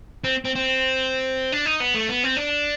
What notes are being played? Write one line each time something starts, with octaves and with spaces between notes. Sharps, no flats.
C4
C4
C4
D4
D#4
B3
A3
B3
C4
D4